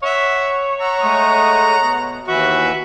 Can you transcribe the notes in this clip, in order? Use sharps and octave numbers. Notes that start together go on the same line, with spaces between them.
C#5 E5 F#5
F#5 A#5 E6
G#3 A3 D#6
B2
D#2 E3 F#4 B4 E5